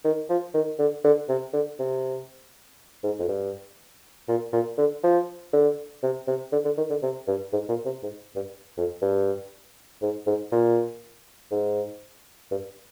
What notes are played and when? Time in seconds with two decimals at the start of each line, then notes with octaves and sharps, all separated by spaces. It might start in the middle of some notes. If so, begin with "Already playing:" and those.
0.04 D#3
0.29 F3
0.54 D#3
0.79 D3
1.04 D3
1.29 C3
1.53 D3
1.79 C3
3.03 G#2
3.19 F2
3.28 G2
4.28 A#2
4.53 A#2
4.78 D3
5.03 F3
5.53 D3
6.03 C3
6.27 C3
6.52 D3
6.65 D3
6.77 D#3
6.90 D3
7.02 C3
7.27 G2
7.53 G#2
7.69 A#2
7.85 C3
8.03 G#2
8.35 G2
8.78 F2
9.02 G2
10.02 G#2
10.27 G#2
10.52 A#2
11.52 G#2
12.51 G2